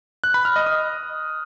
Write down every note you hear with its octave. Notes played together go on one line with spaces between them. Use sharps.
F#6
B5
F6
D#5
D#6